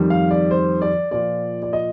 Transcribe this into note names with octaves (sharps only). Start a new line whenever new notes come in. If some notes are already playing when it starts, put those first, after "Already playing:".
Already playing: F2 D#3 G3
F5
D5
C5
D5
A#2 F3 D5
D5
D#5